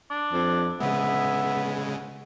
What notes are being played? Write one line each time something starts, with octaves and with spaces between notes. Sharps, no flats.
D4
F2
C#3 G#3 B3 E5